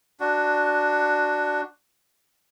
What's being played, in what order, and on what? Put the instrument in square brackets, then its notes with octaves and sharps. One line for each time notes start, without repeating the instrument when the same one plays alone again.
[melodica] D4 F#4